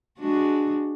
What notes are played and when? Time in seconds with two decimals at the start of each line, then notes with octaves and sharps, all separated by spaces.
0.19 G#3 D4 F#4